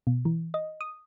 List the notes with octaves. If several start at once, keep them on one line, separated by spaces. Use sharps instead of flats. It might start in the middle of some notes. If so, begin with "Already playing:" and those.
B2
E3
D#5
D#6